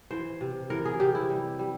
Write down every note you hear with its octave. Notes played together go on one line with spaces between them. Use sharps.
E3 C5
C3
E3 A#4
G#4
C3 G4
E4
G3
G3